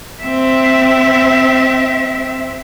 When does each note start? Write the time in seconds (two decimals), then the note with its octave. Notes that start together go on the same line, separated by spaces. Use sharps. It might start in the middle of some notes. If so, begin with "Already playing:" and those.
0.23 C4 E5